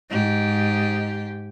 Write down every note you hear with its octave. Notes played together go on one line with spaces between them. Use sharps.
G#2 G4